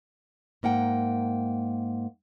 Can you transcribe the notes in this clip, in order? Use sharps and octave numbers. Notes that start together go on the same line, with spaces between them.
G#2 A#3 F#5 G5